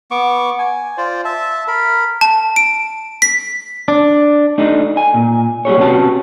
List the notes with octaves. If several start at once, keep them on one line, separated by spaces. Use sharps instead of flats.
B3 C#6 D6
G#5
F4 C5 D5
E5 A5
A#4 B5
A5
D7
B6
D4
A3 D4 D#4
G#5
A#2
G3 E4 G#4 C#5
C3 A#3 B3 C#4 F#4 A5